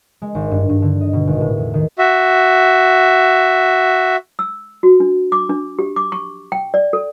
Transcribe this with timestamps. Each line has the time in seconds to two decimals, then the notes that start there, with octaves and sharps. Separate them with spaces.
0.22 G#3
0.35 G#1
0.51 G2
0.69 G2
0.82 D3
1.01 D#5
1.13 B2
1.27 G#1
1.40 A2
1.57 E2
1.74 D#3
1.98 F#4 E5
4.39 E6
4.83 F#4
5.00 D4
5.32 D6
5.49 D4
5.79 G4
5.96 D6
6.12 C#6
6.52 G5
6.74 D5
6.93 A4